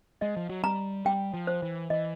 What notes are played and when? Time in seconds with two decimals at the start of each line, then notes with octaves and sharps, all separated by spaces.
0.21 G#3 D#5
0.37 F3
0.49 F#3
0.64 G3 A#5
1.05 G3 G5
1.34 F3
1.47 C5
1.62 E3
1.90 E3 D#5